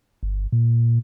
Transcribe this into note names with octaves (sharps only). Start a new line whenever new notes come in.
G1
A#2